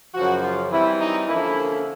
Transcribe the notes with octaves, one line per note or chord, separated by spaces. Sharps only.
F#2 C#3 F3 F#4
F4
E3 G3 C4 E4
D#4
D3 F3 A#3 C#4 E4